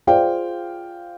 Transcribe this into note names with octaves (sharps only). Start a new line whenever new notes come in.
F4 G#4 C5 D5 F5 G5